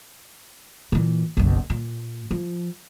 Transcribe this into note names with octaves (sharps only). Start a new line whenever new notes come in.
A#2 E3
F#1 B1
A#2
F3